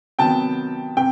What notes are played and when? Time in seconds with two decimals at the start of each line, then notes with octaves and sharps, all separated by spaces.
0.19 C3 D#3 F#3 B3 G5 A5
0.97 C3 G5